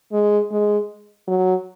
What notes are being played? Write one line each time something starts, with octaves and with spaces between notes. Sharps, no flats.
G#3
G#3
F#3